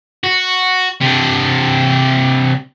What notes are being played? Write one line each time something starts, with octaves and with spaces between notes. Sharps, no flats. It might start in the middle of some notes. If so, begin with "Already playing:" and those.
F#4
C3 D4